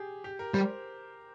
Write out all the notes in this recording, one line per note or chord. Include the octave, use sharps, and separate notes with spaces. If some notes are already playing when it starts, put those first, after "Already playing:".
Already playing: G4 G#4
G4
A#4
G3 C5